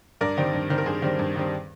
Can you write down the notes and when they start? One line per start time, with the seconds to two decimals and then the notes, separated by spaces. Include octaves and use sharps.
0.21 G2 A#4 D5
0.37 D#3 G3 C4
0.53 G2
0.70 D#3 G3 C4
0.78 A#4
0.86 G2 G#4 C5
1.02 D#3 G3 C4
1.19 G2
1.36 D#3 G3 C4